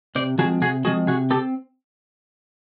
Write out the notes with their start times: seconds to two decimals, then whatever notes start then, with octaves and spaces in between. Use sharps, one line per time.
0.15 C3 C5 D5
0.38 F3 G#3 C4 F#4 G#4
0.62 C3 F#4 G#4
0.84 F3 G#3 C4 F#4 G#4
1.07 C3 F#4 G#4
1.30 C4 G4 A4